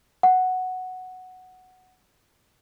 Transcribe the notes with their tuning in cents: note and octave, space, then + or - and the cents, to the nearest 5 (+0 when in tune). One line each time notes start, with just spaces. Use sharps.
F#5 +0